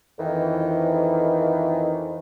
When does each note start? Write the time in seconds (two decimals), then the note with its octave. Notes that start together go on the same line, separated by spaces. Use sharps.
0.19 F2 D#3 E3